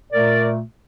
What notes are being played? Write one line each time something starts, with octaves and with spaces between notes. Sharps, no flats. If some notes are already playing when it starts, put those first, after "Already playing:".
A#2 A3 A#4 D5